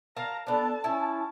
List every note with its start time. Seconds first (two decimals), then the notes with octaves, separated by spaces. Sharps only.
0.17 A#4 F5 A5 A#5
0.47 B3 D4 A4 A5
0.84 C#4 E4